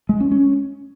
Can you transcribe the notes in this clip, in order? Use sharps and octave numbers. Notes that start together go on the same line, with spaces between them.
G#3
C#4
C#4